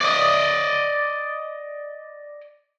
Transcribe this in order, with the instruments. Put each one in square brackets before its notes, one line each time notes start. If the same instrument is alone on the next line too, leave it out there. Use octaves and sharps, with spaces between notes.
[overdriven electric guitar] D5 D#5